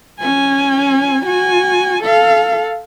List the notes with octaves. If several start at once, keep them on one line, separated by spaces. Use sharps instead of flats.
C#4 G#5
F#4 G#5
A4 F5